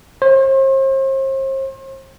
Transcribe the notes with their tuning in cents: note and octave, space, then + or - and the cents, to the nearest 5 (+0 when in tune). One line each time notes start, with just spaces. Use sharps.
C5 +40